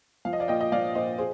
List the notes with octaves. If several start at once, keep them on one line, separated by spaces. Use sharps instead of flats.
F3 F5
D#5
D5 F5
A#2 D#5 G5
D#5
F3 D5 F5
A#2 C5 D#5
G#4 C5